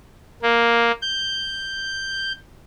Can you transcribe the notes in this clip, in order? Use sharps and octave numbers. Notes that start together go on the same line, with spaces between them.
A#3
G6